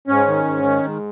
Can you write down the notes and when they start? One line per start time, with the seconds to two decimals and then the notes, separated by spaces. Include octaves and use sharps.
0.08 G#2 C#4
0.27 D#3
0.45 G#2
0.63 D#3
0.83 G#2